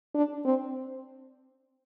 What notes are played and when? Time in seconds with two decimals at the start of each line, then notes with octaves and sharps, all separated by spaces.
0.15 D4
0.45 C4